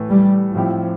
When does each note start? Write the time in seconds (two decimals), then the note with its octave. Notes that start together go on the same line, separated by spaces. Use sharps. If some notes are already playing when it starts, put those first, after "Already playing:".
Already playing: A2 E3 A3
0.10 G3
0.55 A2 F3 G3 C4 E4 G4